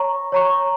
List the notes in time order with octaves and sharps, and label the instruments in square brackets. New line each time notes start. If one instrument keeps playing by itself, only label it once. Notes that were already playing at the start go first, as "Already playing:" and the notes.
Already playing: [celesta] C#5 A#5 C#6
C#5 A#5 C#6